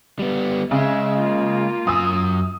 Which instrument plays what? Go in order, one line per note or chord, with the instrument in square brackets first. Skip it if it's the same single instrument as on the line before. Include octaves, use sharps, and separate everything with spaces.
[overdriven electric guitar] G3 B3
[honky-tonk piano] C#3 [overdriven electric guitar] G#3 [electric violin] E5
[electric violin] A#3 F4
[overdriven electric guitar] F#2 G#5 [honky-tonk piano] D#6 E6